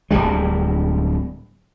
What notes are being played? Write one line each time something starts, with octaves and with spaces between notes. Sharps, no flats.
D1 A#1 G3 G#3